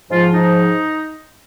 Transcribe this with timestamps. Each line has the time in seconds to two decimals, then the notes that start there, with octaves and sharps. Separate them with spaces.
0.11 G#2 F3 F4
0.32 D#4